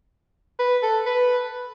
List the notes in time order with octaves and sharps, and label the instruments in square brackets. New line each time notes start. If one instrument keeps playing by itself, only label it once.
[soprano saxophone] B4
A4
B4